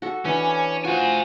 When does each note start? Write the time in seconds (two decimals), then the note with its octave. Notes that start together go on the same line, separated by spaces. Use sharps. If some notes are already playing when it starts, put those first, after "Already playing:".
0.02 F#4 A4
0.25 E3 C#4 D4
0.85 F4 F#4 C5 G#5